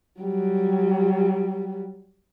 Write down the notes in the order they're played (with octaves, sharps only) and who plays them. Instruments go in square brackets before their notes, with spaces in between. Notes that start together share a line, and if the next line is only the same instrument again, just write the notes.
[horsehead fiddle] F#3 G3